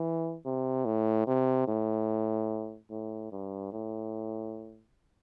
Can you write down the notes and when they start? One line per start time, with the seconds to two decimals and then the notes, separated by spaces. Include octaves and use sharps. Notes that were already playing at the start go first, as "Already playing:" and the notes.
Already playing: E3
0.45 C3
0.85 A2
1.27 C3
1.67 A2
2.90 A2
3.32 G2
3.73 A2